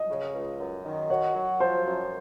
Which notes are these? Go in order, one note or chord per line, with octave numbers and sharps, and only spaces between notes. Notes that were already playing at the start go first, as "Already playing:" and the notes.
Already playing: D#5
C#3
C#2
F#2
D#3
F#4 C#5
F#3
F3 C5
F#2